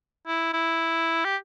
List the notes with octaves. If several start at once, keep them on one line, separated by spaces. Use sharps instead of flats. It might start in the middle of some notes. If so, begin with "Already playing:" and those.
E4
E4
G4